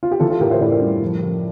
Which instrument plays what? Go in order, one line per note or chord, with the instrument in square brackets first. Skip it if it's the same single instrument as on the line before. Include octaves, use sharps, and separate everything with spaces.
[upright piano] F4
G4
E3 F4 A4
F4 A4
A2 G4 A#4
C5 E5
A2 A#4 D5
G3
F3
F3